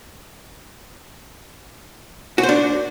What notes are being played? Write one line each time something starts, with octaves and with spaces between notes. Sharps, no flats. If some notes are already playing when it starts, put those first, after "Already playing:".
F#4
C5
D4